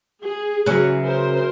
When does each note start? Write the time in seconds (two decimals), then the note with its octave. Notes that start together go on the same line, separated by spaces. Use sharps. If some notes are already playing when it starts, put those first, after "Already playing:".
0.24 G#4
0.66 C#3 E3 F#3 C#4 E4 F#6
1.04 A#4 C5